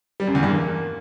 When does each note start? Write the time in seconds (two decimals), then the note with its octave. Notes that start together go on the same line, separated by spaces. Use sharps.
0.20 G3
0.27 F#2
0.35 E2
0.43 G2
0.50 A#3